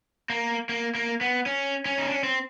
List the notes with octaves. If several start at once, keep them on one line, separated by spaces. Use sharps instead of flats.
A#3
A#3
A#3
B3
C#4
C#4
D#4
D4
C#4
C4